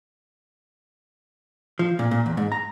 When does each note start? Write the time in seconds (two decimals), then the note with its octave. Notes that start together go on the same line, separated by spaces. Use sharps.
1.79 F3
1.99 A#2
2.11 A#2
2.26 E2
2.37 G#2
2.52 A#5